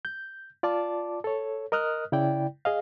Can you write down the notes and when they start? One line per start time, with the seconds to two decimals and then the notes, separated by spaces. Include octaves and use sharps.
0.05 G6
0.63 F4 D5 A5 D6
1.24 A4 C#5
1.72 A#4 D#5 D#6 F6 F#6
2.12 C#3 E4 D5 G5
2.65 G#4 D#5 F5